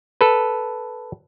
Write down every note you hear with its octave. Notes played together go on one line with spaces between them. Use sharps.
A4 B4